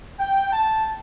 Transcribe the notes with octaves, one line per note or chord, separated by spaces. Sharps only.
G5
A5